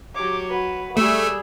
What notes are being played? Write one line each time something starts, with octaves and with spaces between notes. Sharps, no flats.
F#3 G4 C#5 D6
F#4 B4
G3 A3 G#4 E6